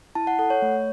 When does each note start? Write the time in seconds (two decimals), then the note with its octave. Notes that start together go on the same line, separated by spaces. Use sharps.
0.15 E4 A5
0.27 F#5
0.39 A4 F#5
0.50 C#5
0.62 A3